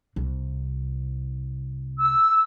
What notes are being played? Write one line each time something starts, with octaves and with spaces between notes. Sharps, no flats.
C2 C3
E6